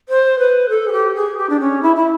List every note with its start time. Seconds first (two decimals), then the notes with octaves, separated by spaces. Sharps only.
0.09 C5
0.39 B4
0.69 A4
0.88 G#4
0.92 G4
1.15 G#4
1.38 G4
1.49 D4
1.60 C#4
1.82 E4
1.96 E4